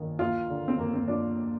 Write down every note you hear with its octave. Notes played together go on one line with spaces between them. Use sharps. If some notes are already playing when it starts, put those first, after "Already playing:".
Already playing: A#1 D#3
D#2 F4
D3
C4
D#2 A#3
C4
F3 D4